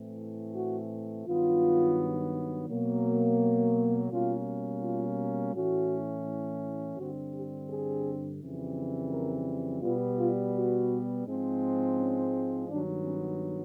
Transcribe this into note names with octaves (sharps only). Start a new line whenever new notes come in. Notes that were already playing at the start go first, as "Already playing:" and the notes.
Already playing: A2 E3 A3 C4
F#4
G2 D#3 F#3 B3 F4
B2 F#3 A#3
B2 G3 A#3 C#4 F4
F4
A2 E3 A3 C#4 F#4
G2 D3 G3 C4 F#4
G4
G#4
F2 C#3 E3 G3 C4
A#4
B2 G3 B3 F4
F4
F#4
G#2 F3 G#3 C4
C#4
G2 D#3 F#3 B3 D4
C#4